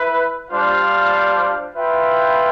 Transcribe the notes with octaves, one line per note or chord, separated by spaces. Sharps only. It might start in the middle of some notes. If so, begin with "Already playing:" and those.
Already playing: E4 B4
G3 D4 F4 C5 F5
F4 B4 E5 G5